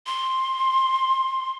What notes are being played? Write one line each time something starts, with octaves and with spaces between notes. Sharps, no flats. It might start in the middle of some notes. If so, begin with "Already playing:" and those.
C6